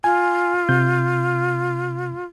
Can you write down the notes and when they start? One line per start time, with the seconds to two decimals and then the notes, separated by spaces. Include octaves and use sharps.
0.04 F4 G#5
0.69 C3 G6